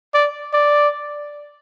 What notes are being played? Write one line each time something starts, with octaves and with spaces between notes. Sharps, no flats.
D5
D5